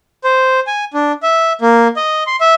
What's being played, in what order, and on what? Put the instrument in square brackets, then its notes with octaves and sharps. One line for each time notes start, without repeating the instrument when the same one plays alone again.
[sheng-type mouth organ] C5
G#5
D4
E5
A#3
D#5
C6
E5